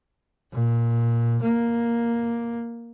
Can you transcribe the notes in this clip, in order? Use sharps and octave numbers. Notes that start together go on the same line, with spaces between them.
A#2
A#3